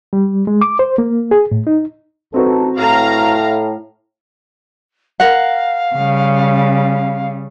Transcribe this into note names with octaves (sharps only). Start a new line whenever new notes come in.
G3
G#3
D6
C5
A#3
G#4
A2
D#4
A1 C4 D#4 F#4 A4 B4
A2 F5 A#5
A#4 F5 F#5
C#3 G3